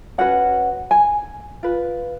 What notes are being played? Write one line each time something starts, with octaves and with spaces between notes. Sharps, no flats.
C#4 F#4 B4 F#5
G#5
F4 B4